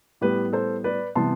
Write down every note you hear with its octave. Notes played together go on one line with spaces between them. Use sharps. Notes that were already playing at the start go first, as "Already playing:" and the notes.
A2 G3 B3 G4 B4
A4 C5
B4 D5
C3 E3 G3 B3 A5 C6